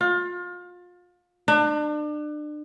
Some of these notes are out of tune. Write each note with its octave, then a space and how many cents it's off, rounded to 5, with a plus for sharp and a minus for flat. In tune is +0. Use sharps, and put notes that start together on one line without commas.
F4 +30
D4 +35